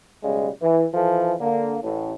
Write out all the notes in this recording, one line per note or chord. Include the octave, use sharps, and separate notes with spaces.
B1 C#3 G3 G#3
E3
E3 F3 A4
D3 A#3
A1 A2